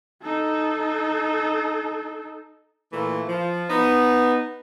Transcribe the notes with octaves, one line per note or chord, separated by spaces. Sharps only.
D#4 A4
A#2 E3 A3
F3
B3 D#4